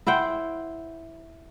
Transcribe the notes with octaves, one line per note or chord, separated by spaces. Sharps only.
E4 C5 F#5 G5